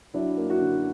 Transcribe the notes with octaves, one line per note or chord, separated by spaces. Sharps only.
F#3 D4 E4
A#3
E4 F#4
D3